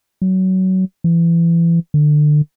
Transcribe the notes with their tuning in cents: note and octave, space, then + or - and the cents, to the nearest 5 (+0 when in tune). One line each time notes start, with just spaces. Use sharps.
F#3 +20
E3 +30
D3 +25